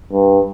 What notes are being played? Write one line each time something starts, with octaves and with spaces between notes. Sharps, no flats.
G2